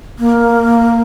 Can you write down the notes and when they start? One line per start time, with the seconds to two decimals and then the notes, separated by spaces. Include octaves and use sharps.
0.19 A#3